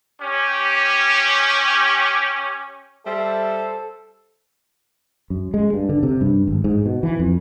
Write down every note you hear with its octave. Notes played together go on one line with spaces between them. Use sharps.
C#4 G4
G3 A4 C5 E5
F#2
G#3
G2
D3
C3
G2
G#1
G#2
B2
E3
F2